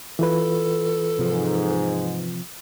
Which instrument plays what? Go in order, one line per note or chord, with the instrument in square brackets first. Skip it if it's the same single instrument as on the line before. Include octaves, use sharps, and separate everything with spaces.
[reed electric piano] E3 F4 B4 [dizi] A4
[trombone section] G#2 [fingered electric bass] C3 F3